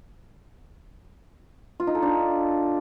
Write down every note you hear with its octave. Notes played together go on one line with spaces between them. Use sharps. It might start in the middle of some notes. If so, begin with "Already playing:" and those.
F4
D#4
A4
D4